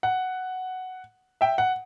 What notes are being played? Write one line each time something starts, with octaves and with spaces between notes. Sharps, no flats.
F#5
E5 G5
F#5